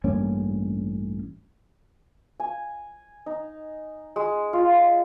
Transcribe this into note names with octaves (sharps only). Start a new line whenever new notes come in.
A1 G2 A#3 C#4
G#5
D#4
G#3
F4